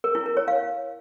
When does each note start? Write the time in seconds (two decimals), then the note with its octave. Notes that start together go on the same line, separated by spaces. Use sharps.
0.04 A#4
0.15 E4
0.26 A#4
0.37 C#5
0.48 F5